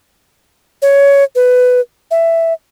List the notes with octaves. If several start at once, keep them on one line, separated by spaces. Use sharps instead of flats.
C#5
B4
E5